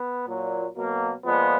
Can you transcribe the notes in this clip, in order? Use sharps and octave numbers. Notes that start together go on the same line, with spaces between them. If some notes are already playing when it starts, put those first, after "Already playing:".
Already playing: B3
A#2 F#3
B2 F#3 A#3
A#2 F3 G#3 B3